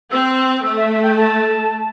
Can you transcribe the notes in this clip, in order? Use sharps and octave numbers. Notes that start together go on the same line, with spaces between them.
C4 E6
A3 E6
E5
E5
G5
A5